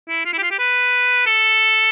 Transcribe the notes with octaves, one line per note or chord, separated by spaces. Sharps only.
E4
F4
E4
G4
F4
G4
B4
A4